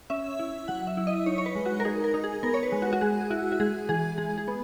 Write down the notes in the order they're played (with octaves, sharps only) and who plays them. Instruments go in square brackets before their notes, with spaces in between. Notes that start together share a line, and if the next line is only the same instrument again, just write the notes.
[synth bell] C#4 E5
E4
F#3 F#5
E5
E4
D#5
D#4 C#5
C#5
B4
G#3
F#4
A#4
D#4 G#4
A#4
D#4
G#4
B3 A#4
C#5
B4
G#3
F#4
F#4
G#3 G#4
E4 F#4
F#4
G#3 G#4
E3 G#4
G#3 G#4
G#4
B3